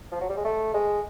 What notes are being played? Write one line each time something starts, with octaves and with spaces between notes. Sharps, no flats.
F3
F#3
G3
G#3
A3
G#3